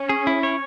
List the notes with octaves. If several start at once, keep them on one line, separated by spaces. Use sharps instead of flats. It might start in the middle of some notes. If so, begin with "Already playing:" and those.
Already playing: C#4
G#4
E4
C#5